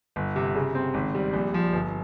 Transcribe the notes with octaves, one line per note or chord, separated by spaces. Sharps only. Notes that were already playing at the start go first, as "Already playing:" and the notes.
G1
C3
C#3
C4
G#1
G3
A#1
F3
G1